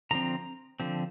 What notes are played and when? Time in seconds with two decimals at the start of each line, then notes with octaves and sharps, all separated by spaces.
0.11 D3 F3 C4 A#5
0.80 D3 F3 C4